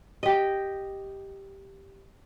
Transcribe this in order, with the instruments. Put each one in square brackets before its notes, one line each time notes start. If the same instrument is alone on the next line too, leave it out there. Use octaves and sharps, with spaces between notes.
[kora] G4 D#5